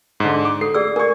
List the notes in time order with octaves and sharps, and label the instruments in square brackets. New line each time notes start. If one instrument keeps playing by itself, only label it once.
[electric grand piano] G#2 D3
D6
[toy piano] A4 [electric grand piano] C7
[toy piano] G#4 D5 E6
[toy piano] A#4 D5 [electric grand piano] G#5 C#6